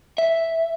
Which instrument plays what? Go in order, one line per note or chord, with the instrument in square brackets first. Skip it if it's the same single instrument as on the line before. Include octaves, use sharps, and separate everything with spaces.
[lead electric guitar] E5